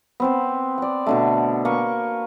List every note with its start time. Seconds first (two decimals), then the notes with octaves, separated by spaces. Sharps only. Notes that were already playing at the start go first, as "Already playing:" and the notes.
0.20 B3 C4 C5
0.78 D5 F#5
1.06 B2 D3 A3
1.65 A#3 B4 C#6